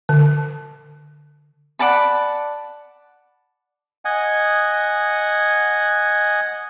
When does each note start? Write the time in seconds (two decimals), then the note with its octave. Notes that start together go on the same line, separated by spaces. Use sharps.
0.09 D3
1.79 D5 F#5 A5 B5
4.05 D#5 F#5 G#5